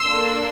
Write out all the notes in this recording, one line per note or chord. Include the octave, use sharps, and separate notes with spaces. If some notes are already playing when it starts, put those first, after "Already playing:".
Already playing: C6 E6
A#3 D4 A4